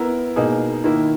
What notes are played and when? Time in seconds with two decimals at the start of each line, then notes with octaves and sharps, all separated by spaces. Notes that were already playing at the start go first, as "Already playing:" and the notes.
Already playing: B3 E4 A#4
0.36 B2 A#3 D#4 G#4
0.84 D#3 A#3 E4